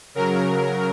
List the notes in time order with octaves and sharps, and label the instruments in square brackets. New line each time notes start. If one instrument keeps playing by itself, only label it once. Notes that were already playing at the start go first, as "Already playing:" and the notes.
[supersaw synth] C#3 F#3 A#4